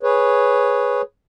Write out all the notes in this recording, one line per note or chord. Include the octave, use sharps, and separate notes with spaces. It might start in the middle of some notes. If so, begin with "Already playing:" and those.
G#4 B4 C#5